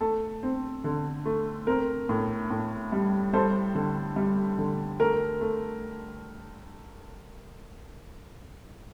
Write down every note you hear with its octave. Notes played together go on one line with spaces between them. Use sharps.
A3 A4
C4
D3
A3
C4 A#4
A2
A2
G3
G3 A4 C5
D3
G3
D3
A3 A#4
A3